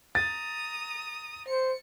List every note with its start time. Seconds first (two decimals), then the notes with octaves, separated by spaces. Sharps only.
0.15 A#5 D#6 A6
1.48 C5 C#7